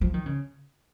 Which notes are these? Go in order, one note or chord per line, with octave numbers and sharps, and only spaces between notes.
F3
D#3
C#3